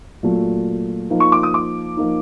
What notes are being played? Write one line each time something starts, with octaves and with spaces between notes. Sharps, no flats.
A#2 F#3 A3
F3 A#3 D#4
C#6
D6
D#6
D6
F3 A#3 D#4